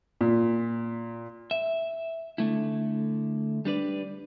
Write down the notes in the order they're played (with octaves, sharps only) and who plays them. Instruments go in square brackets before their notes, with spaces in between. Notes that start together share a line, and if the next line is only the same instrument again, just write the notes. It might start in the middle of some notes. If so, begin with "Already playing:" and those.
[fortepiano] A#2
[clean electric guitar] E5
D3 A3 E4
G3 D4 B4 D5